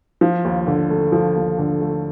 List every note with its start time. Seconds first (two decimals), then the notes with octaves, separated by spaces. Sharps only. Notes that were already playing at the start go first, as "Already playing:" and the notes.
0.21 F3
0.45 D#2
0.67 D3
0.90 A3
1.12 F3
1.36 D#2
1.58 D3
1.81 A3